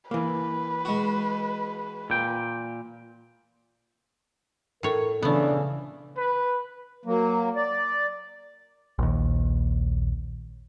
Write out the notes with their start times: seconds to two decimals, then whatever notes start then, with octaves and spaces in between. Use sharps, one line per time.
0.11 E3 A#3 B4
0.85 G#3 F#4
2.10 A#2 G5
4.83 A2 A#4 C#5
5.23 C#3 E3 A3 B3 D4
6.17 B4
7.05 F#3 A#3
7.56 D5
8.99 A#1 D#2